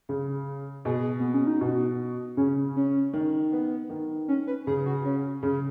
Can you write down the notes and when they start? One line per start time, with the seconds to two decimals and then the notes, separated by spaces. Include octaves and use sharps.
0.09 C#3
0.85 B2 G#4
1.20 B3
1.34 C#4
1.47 D#4
1.61 B2 F#4
2.37 C#3 C#4
2.76 C#4
3.13 D#3
3.52 B3
3.90 D#3
4.28 C#4
4.47 B4
4.67 C#3 G#4
4.86 F#4
5.05 C#4
5.42 C#3 C#4